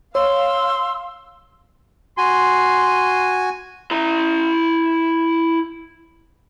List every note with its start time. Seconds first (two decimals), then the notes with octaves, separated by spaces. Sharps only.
0.15 C#5 F5 C6 E6
2.18 F#4 G#5 C6
3.91 E4 A#5